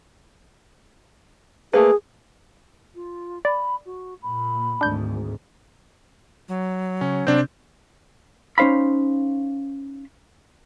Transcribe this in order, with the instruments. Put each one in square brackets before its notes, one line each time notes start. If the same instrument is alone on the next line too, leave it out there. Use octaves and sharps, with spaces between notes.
[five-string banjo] A3 A#3 B4 [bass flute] G#4
[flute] F4
[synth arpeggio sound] D5 [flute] B5
[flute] F#4
[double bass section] A#2 [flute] B5
[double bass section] G#1 D2 G#2 [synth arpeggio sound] D4 G6
[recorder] F#3
[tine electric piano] C#3 [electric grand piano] C#4
[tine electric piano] C3 G6 [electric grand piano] C4 D4
[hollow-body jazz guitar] C#4 D#4 C5 F5 B5